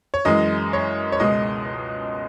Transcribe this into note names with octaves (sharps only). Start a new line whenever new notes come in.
C#5
F#2 E3 G#3 D#5
C#5
C#5
C#2 B2 G#3 D#5